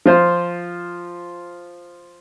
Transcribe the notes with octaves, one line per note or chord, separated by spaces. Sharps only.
F3 F4 C5